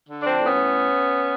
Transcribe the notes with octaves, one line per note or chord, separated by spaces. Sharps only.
D3
F3 C4 D4
A2
B3 C#4
A2